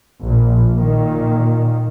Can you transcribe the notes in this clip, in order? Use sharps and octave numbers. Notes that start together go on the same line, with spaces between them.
A#1 A#2
A#2 D#3